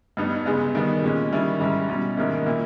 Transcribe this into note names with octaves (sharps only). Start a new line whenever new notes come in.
G2 G3 B3 D#4
C#3 G#3 B3
D#3 G3 B3
A#2 G#3 C#4
D#3 G3 C#4 E4
G#2 G3 C#4 E4
B2 G3 C#4
G#2 D#3 A#3 C#4 E4
A#2 A#3 E4